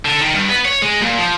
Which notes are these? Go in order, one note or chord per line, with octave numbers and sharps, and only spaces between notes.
D3
D#3
G2
B3
C#5
G#3
A#2
F3